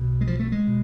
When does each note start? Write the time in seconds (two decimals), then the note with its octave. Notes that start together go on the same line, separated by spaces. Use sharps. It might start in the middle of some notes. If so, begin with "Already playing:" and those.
Already playing: B1 B2
0.21 G#3
0.27 F3
0.40 A3
0.52 G#3
0.67 B2